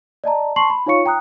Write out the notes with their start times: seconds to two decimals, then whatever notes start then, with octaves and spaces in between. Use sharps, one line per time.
0.24 D5 D#5 A5 A#5
0.56 A5 C6 C#6 C7 F#7
0.70 B5
0.86 D#4 F4 C#5 F5 C#6 C#7
1.06 G5 A#5 D#6 F#6